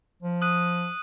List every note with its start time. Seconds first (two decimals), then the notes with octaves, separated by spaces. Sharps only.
0.23 F3
0.42 D#6 F#6 D#7